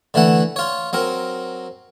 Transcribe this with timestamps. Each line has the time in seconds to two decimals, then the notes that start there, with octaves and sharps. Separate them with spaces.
0.14 D3 E3 A3 F#5
0.56 F4 C#5
0.93 F#3 C4 A#4